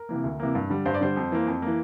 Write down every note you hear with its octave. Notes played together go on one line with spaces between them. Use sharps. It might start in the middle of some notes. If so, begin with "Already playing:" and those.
Already playing: A#4
C3 E3 A#3
D2
C3 E3 A#3
G2
D3 G3
G2 C5
D5
D3 G3 C5
F2
E3 A#3
F2
E3 A#3